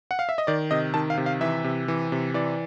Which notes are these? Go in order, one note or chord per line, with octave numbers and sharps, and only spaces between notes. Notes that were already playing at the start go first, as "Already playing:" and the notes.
F#5
F5
E5
D#5
D#3 D5
C3 D#5
D#3 A5
F5
C3
F5
E3 E5
C3
E3
C3
E3 D5